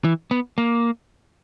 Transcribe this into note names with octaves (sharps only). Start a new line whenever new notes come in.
E3
B3
A#3